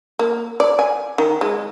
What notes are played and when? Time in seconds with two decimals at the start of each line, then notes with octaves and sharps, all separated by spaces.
0.19 A#3
0.60 D5
0.79 G#5
1.18 D#3
1.41 G#3